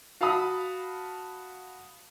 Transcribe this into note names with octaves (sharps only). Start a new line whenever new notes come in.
F#4 F5 A5 B5 D#6